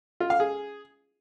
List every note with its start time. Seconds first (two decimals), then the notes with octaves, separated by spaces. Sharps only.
0.20 F4
0.30 F5
0.40 G#4